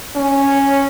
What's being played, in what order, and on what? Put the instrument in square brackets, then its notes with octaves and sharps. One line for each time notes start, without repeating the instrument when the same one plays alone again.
[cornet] C#4